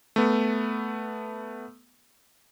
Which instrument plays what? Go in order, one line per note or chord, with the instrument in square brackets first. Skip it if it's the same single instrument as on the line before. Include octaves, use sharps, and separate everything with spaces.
[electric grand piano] A3 B3